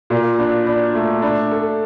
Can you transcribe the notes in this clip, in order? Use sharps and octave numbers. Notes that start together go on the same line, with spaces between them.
A#2
D4
D4
A3
D4
A4